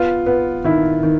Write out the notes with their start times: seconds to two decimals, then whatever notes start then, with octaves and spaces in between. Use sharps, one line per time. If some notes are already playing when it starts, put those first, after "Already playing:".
Already playing: B3 F4
0.26 B3
0.64 D#3 E4
1.03 D#3